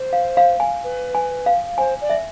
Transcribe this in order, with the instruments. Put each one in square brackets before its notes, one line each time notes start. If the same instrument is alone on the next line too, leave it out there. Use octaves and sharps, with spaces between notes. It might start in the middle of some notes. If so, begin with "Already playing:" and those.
Already playing: [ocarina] C5
[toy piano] F5
F5
G#5
[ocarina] B4
[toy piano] G#5
F5
[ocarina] C5 [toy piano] G#5
[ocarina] D5
[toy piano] E5